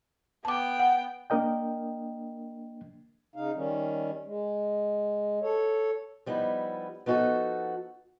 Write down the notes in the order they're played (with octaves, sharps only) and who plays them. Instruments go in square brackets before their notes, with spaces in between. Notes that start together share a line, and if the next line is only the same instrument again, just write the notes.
[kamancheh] B3 G5 [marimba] A5 D6
[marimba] F#5
[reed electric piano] A#3 D4 A#4 D#5 G5
[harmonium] C#3 D#4 F5
D#3 G3 C#4
G#3
A4 C#5
[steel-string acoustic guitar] F3 G3 B3 D#4 E4
F3 B3 D#4 F4 F#4 A4